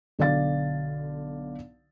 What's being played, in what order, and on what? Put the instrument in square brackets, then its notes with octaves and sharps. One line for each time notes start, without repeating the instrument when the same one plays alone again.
[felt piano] B1 D3 D5 F5 A6